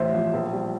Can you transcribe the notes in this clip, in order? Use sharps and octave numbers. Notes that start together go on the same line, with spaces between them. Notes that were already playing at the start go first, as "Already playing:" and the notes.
Already playing: A1 C5 E5
F3
A#1
G3